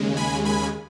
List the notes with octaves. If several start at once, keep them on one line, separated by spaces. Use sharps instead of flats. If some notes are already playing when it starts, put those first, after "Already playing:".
Already playing: D#2 C#3 G#3
G#5 B5
G#5 B5